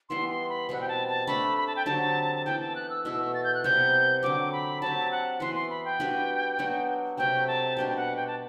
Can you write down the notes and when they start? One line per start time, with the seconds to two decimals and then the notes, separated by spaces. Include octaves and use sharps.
0.09 E3 G3 B3 E4 C6
0.29 C6
0.50 B5
0.69 B2 G3 C4 F#5
0.81 G5
0.88 A5
1.08 A5
1.27 A3 D4 A4 B5
1.58 B5
1.67 A5
1.76 G5
1.85 D3 F#3 C4 G4 A5
2.35 A5
2.45 E3 B3 E4 A4 G5
2.60 A5
2.76 F#6
2.90 E6
3.05 B2 A3 E4 E6
3.34 A6
3.44 G6
3.54 F#6
3.64 C3 G3 B3 G6
4.23 D3 F#3 C4 D6
4.52 B5
4.81 F#3 C4 G4 A5
5.12 F#5
5.40 E3 B3 F#4 B4 C6
5.55 C6
5.70 B5
5.85 G5
6.00 G3 D4 F#4 B4
6.59 F#3 B3 D4 F#4
7.17 C3 F#3 A3 G5
7.47 A5
7.77 B2 G3 D4 F#4 G5
7.88 G5
7.96 F#5
8.16 G5
8.27 A5